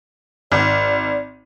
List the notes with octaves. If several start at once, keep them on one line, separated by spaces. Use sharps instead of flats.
G#1 D5